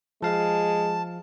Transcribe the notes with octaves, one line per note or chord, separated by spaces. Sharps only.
F3 G#3 F5 A5